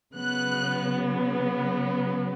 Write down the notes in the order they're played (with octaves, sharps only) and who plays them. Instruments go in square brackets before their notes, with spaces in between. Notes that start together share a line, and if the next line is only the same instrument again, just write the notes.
[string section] C#3 F#3 B3 F#6